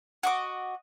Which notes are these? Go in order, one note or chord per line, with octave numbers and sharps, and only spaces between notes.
F#4 D#5 D6